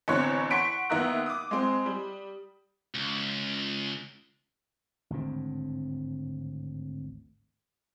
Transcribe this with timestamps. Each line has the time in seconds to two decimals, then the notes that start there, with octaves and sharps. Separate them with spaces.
0.08 A1 E2 D3 C4 C#5 F#6
0.51 F#5 C6 C#6 B6 D7
0.90 D#2 B3 D#4 E5 A#5 F#6
1.26 D6 D#6
1.51 G#3 C4
1.86 G3
2.94 C#2
5.10 G#1 D2 A2 C4